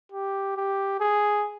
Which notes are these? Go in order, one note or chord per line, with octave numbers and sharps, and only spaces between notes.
G4
G4
G#4